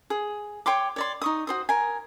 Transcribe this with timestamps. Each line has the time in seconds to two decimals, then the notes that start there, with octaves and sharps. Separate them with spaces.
0.10 G#4
0.66 C#5 G5 C6 D6
0.96 C#5 D5 C6
1.22 D#4 C#6 D#6
1.47 F#4 C5 D#6
1.69 A#4 G#5